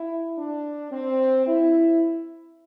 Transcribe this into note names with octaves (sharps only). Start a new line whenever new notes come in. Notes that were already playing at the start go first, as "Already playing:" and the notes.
Already playing: E4
D4
C4
E4